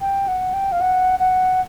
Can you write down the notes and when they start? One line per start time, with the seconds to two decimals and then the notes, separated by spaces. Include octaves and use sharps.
0.01 G5
0.28 F#5
0.54 G5
0.72 F5
0.81 F#5
1.20 F#5